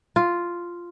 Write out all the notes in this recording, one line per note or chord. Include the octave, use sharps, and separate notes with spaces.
F4